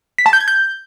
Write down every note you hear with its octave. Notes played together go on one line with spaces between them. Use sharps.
B6
A5
G6
G#6
G6